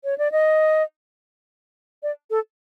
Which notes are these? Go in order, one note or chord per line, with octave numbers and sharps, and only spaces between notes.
C#5
D5
D#5
D5
A4